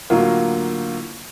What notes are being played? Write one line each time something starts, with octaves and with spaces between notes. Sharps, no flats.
A2 D3 F#3 A#3 F4